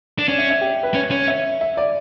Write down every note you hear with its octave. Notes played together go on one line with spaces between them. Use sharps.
D4
C#4 D5
E5
E5
G4
B4
C#4 C#5
C#4 C#5
E5
E5
D5